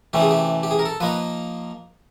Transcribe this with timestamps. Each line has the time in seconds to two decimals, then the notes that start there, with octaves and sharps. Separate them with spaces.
0.13 C3 E3 A3 C#4 G4
0.22 G#4
0.31 G4
0.63 G4
0.71 G#4
0.79 A#4
0.85 A4
1.00 F3 A#3 D#4 B4